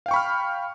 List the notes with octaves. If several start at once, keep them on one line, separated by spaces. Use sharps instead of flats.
F5 G5 B5 C#6 F6